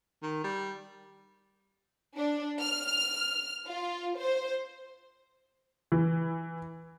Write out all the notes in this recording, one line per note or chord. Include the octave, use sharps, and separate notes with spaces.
D#3
G3
D4
F6
F4
C5
E3